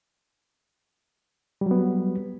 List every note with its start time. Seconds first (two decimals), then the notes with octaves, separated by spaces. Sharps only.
1.61 G3
1.66 F#3
1.71 B3